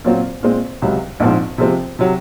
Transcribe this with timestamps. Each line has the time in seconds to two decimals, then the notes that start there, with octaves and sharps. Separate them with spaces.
0.04 A#2 F#3 C4 F4
0.43 A#2 G#3 C4
0.82 C#2 C3 F#3
1.20 A#1 G#2 F3 C4
1.58 C3 F3 G#3 C4
1.99 C3 F#3